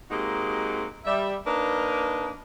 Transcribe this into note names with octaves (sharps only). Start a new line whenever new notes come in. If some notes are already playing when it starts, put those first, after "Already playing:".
G#3 A#3 C4 D#4 F#4 G4
G3 E5
A#3 D4 D#4 A#4 B4